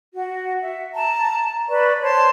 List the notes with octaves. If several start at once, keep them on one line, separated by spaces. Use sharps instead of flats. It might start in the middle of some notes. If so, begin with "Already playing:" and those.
F#4
E5
A5 A#5
B4 D5 B5 C#6
C5 C#5 A5 C6